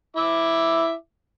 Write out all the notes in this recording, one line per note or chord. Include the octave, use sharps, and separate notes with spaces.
E4 E5 D6